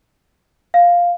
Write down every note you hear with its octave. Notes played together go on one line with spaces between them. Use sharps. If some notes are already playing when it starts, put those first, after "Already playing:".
F5